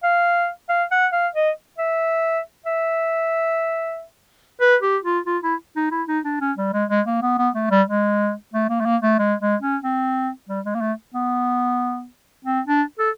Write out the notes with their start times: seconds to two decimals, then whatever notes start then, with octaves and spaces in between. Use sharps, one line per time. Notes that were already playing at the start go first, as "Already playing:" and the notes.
0.03 F5
0.69 F5
0.92 F#5
1.12 F5
1.35 D#5
1.79 E5
2.66 E5
4.60 B4
4.82 G4
5.04 F4
5.26 F4
5.43 E4
5.76 D#4
5.91 E4
6.08 D#4
6.24 D4
6.41 C#4
6.58 G3
6.73 G#3
6.90 G#3
7.07 A#3
7.22 B3
7.38 B3
7.55 A3
7.71 G3
7.87 G#3
8.54 A3
8.69 A#3
8.80 A3
8.85 A#3
9.02 A3
9.19 G#3
9.40 G#3
9.62 C#4
9.84 C4
10.49 G3
10.65 G#3
10.75 A#3
10.81 A3
11.14 B3
12.45 C4
12.67 D4
12.99 A4